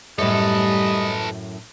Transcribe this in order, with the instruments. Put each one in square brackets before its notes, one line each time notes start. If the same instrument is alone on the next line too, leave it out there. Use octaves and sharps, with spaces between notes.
[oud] F#2 A2 [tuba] G3 [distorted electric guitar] A4 B4 [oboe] D#5